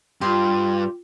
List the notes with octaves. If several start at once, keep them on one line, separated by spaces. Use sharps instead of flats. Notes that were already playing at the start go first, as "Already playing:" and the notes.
G2 F4 G4 G5 C6